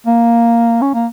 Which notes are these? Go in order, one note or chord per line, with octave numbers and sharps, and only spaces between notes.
A#3
C#4
A#3